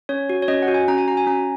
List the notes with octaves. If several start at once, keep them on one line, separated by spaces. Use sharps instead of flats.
C#4 C#5
F#4
C#5
C#4 D#5
F#5
F#4
G#5
C#4 A#5
G#5
F#4 A#5
G#5
C#4 A#5